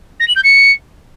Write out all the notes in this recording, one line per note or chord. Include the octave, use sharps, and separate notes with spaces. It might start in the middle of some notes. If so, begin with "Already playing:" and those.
A#6
F#7
G6
C#7